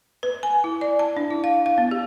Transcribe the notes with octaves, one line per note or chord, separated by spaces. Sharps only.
B4
G#5
E4
D5
A5
D4
E4
F5
F5
B3
G4